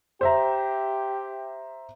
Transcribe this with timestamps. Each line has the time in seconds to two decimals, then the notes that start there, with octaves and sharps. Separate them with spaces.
0.21 G4 C5 E5 A#5